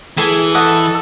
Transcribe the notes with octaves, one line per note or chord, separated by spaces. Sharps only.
E3 G#4 A4 G#5
A4 D#5 F#5